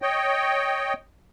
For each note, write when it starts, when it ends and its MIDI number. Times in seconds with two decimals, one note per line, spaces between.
0.02 0.93 73
0.02 0.93 75
0.02 0.93 79